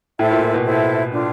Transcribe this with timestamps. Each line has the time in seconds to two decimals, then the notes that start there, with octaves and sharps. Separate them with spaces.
0.18 A2 E4 A4 C5 E5
0.31 A#2
0.42 A#2
0.54 B2
0.66 E4 A4 C5 E5
1.13 D4 F4 A4